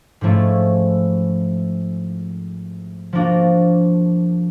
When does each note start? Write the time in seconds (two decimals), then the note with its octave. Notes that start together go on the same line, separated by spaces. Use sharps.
0.21 G#2 F3 A3 C#4 E4
3.13 F3 A#3 D4 F#4